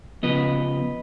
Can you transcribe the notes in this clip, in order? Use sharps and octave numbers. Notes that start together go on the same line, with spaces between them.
C#3 F3 B3 B4 D#5